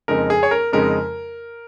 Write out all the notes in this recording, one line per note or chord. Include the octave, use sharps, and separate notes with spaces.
F2 C#3 G#3 D#4 A#4
G#4
C#5
A#4
F2 C#3 G#3 D#4 A#4